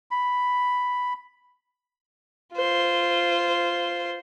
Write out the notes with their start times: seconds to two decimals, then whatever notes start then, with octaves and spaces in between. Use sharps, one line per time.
0.11 B5
2.56 F4 C5